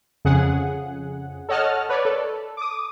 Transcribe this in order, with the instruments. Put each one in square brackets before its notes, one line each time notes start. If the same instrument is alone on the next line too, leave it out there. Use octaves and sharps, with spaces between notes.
[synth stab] F2 C#3 G#4 F#5
A4 C#5 D#5 F#5 A5 F6
B4 C#5 D5
A4
D6 D#6